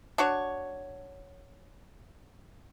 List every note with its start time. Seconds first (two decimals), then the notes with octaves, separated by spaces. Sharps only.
0.18 D4 F#4 C#5